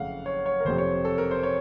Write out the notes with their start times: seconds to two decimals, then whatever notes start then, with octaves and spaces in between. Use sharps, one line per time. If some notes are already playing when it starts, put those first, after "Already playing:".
Already playing: F#1 F2 C#3 A3 F5 F#5
0.26 C#5
0.46 C#5
0.60 A#4
0.65 F1 F2 C3 C5
0.78 C#5
1.05 A4
1.18 A#4
1.31 C5
1.43 C#5